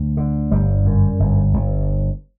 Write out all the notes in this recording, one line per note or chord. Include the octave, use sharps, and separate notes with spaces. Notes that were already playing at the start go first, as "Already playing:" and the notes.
Already playing: D2
D3
G1 G3
F#2
G1
G1